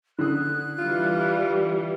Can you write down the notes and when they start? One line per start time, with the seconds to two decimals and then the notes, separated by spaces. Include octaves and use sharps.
0.19 D3 D#6 F#6
0.79 E3 G3 F4